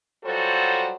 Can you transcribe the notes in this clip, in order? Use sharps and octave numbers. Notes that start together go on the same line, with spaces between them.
F#3 G3 F4 F#4 A4 C5